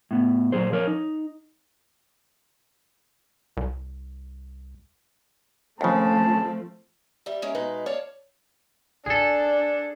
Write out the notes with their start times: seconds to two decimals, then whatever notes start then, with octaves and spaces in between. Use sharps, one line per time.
0.11 A2 B3
0.52 A#2 F#3 G#4 C5
0.72 F3 A#4 C#5
0.87 D#4
3.57 C2
5.81 D#2 C#3 F3 A3 C4 A5
7.26 G3 E5
7.42 G#3 C#4 A#4
7.55 B2 G#3 D#4 B4
7.86 C#5 D5 F5 A5
9.06 A1 D2 D4 G#4 A4